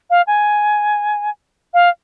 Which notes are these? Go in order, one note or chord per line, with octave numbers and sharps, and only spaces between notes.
F5
G#5
F5